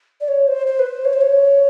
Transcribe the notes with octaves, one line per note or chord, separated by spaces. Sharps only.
D5
C#5
C5
C5
B4
C5
C#5
C5
C#5